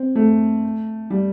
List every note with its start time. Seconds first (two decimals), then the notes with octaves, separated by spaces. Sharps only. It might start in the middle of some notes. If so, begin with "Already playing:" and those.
Already playing: C4
0.16 A3
1.10 G3